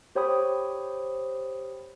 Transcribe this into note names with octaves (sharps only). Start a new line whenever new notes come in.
G4 C5 C#5 G5 B5 D#6